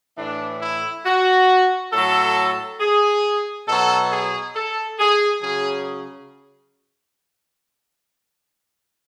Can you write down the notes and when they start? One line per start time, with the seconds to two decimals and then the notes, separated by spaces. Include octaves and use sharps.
0.18 A2 E3 D4
0.61 E4
1.06 F#4
1.93 A2 F#3 A4
2.80 G#4
3.67 B2 F#3 A4
4.12 G#4
4.56 A4
5.00 G#4
5.42 C#3 F#3 G#4